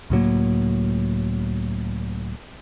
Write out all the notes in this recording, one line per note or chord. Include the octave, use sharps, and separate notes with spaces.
C#2 A2 F#3 A#3